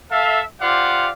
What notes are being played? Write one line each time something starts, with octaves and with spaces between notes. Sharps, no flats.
A4 E5 F5
F4 G4 C5 D5 F5 F#5